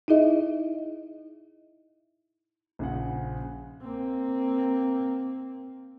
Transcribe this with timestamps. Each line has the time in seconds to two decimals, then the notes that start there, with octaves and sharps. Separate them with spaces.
0.08 D#4 E4 G#4 D#5 E5
2.79 A#1 C#3 F#5
3.82 A#3 C4